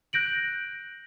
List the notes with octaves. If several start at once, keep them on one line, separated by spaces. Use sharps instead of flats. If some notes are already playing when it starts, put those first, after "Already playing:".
F#6 G6 A#6 D7 F#7